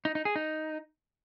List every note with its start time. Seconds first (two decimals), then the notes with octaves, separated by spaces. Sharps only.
0.05 D#4
0.15 D#4
0.25 G#4
0.36 D#4